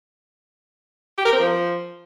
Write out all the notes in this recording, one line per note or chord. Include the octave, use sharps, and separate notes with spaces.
G4
A#4
C4
F3